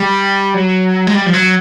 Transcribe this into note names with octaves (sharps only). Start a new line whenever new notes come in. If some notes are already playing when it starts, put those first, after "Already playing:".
Already playing: G3
F#3
G#3
G3
F3
F#3